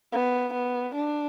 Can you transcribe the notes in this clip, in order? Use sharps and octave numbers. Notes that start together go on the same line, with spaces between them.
B3
B3
D4